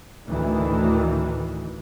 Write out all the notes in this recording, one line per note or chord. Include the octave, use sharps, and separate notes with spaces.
D2 A2 D#3 E3